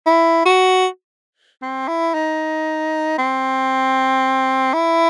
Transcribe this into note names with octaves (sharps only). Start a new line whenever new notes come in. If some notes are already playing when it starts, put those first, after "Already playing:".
E4
F#4
C4
E4
D#4
C4
E4